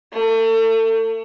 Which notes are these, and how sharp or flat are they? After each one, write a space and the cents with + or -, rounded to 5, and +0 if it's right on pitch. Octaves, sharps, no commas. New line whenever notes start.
A3 +35